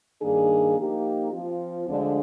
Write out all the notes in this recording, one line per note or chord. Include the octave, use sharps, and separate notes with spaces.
G2 D#3 A#3 D4 G#4
F3 A#3 D#4 G4
F3 C4 F4
D2 D3 F3 G#3 D4